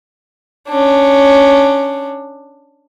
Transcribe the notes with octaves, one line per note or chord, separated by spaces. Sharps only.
C#4 D4